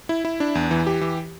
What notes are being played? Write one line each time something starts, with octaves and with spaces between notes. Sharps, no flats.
E4
E4
D4
E2
E3
G4
E3